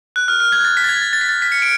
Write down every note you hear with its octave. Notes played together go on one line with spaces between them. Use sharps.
F#6
F6
F6
G#6
A6
B6
A6
G#6
A6
A6
B6
A6
B6
C#7
D7